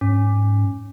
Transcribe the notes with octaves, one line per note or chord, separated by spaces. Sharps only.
G#2 C#4